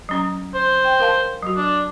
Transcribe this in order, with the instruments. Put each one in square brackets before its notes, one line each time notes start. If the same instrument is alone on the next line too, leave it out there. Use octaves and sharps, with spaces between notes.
[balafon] F#3 C#4 A#5
[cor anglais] C5
[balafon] G5
A#4 F5 A5
F#3 F#4
[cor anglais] D4